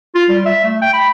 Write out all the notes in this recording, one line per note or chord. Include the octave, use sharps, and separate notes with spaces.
F4
G3
E5
A3
G5
B5